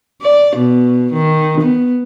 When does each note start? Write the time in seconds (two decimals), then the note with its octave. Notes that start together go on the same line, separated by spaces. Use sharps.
0.22 D5
0.57 B2
1.14 D#3
1.61 B3